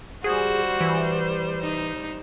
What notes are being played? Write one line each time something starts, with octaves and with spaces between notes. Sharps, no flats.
G3 F#4 G#4 C5
E3
D#4